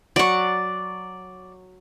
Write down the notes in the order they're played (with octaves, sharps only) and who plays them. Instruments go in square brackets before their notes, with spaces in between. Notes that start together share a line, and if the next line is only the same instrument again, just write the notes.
[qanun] F#3 F#5 [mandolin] D5 C#6